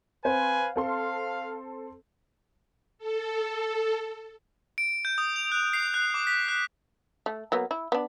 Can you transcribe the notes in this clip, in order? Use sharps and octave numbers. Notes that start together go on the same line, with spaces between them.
C4 B4 C5 F5 G#5
C4 A4 F5 C6
A4
D7
G6
D#6
F7
F#6
C7
F#6
D6
B6
F#6
A3
F#3 A#3 B3
E4
B3 D4